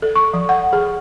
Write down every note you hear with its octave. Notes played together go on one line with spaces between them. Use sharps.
A4
C#6
F3
F#5
G#4